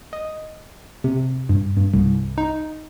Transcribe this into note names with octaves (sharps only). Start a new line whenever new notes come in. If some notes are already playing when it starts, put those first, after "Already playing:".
D#5
C3
G2
G2
C2
D#4